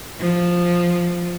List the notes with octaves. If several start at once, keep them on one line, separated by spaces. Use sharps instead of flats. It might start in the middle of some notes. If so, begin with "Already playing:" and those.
F3